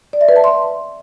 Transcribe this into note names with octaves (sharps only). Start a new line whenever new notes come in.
D5
E5
B4
A5
C6